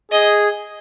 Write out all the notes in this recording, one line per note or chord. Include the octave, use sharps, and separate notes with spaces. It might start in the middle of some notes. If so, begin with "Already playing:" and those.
G#4 D#5